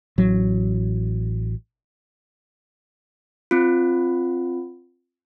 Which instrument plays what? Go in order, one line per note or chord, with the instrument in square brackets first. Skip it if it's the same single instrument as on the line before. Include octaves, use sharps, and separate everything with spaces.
[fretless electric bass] A1 F#3
[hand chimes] C4 F4